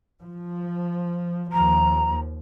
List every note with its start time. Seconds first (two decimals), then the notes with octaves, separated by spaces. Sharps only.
0.21 F3
1.52 D#2 F3 A#5